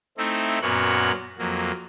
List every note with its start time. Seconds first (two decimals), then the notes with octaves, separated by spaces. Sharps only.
0.18 A3 C4 D#4 E4
0.62 F#2 A#2 A#3 B3 C#5 F#6
1.38 F2 F#3 A#3